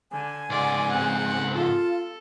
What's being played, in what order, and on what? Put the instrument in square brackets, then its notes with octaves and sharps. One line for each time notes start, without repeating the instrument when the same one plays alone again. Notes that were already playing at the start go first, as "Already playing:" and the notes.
[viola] D3 [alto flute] G#5
[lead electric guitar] C#2 G#2 [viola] D5
[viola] C4 F#5
[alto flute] F4 [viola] A4